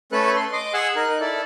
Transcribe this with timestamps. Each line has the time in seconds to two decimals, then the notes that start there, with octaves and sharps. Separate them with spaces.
0.12 A3 C#4 A4 B4 F#6
0.36 C6
0.52 D#5 C6 D6
0.74 G#4 F#5 G#5 E6 F#6
0.96 D#4 A#4 F#6
1.20 E4 A4 D5